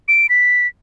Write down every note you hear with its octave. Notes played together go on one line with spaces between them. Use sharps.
D7
B6